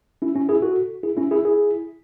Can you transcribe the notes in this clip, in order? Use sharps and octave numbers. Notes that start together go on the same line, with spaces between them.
C#4 E4
C#4 E4
E4 G#4
F#4 A4
E4 G#4
C#4 E4
E4 G#4
E4 G#4